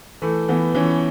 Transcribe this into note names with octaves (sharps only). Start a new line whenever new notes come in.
E3 A3
E3 B3
E3 C#4